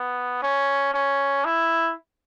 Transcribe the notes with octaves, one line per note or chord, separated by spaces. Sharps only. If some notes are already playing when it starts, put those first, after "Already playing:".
Already playing: B3
C#4
C#4
E4